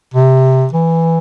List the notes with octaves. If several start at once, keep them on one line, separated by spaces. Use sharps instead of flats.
C3
E3